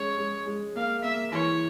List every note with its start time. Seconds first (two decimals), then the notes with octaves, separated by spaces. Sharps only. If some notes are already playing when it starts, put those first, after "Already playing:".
Already playing: G#3 C#4 C#5
0.18 G#3
0.46 G#3
0.76 A#3 F5
1.03 A#3 E5
1.32 E3 C#5